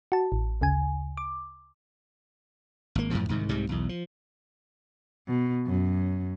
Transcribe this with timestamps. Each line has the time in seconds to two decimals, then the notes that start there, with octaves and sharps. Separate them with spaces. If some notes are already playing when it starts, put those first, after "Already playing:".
0.12 F#4 A5
0.32 A1
0.61 D2 C#3 G#5
1.17 D6
2.95 G#1 A#3
3.10 F#2 A2 F3
3.29 C2 G#2 D#3
3.49 C2 G#2 C3 G3
3.69 B1 E2
3.89 F3
5.28 B2
5.67 F#2